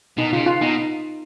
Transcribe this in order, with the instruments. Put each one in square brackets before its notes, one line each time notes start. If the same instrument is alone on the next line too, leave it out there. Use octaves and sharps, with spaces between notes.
[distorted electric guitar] B2 [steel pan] D#4
[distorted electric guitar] C#3 [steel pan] F4
[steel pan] F4
[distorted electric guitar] B2 [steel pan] D#4